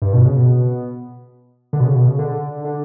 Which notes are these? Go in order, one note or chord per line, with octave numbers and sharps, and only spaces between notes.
G2
B2
C#3
B2
D3
B2
C#3
B2
C#3
D3
D3